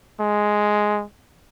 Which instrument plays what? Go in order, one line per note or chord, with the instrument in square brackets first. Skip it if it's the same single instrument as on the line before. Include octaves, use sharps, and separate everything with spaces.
[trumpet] G#3